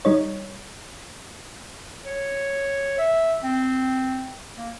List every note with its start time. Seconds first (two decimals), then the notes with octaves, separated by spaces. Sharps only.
0.05 G3 D#4 C#5
2.05 C#5
2.98 E5
3.44 C4
4.57 A#3